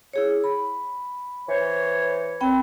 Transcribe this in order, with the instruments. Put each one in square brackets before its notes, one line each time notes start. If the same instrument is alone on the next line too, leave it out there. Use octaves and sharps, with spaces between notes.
[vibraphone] E4 G#4 C#5
B5
[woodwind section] E3 C5 C#5
[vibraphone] C4 G5 B5